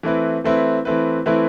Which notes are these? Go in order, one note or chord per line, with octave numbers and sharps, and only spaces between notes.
E3 A3 C4 E4 B4
E3 A3 C4 E4 B4
E3 A3 C4 E4 B4
E3 A3 C4 E4 B4